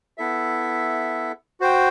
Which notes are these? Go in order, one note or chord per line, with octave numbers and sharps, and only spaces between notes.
B3 E4 A4 E5
F#4 C5 G5